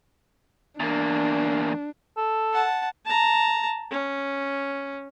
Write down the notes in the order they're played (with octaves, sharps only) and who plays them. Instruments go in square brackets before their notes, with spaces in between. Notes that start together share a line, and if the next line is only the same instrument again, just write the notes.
[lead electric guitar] E2 A#3 [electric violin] D4
[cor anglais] A4
[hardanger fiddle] F#5 A5
[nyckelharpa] A5 A#5
C#4